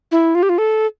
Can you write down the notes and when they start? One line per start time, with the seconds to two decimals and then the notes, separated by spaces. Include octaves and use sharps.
0.12 E4
0.35 F4
0.43 G4
0.49 F4
0.58 A4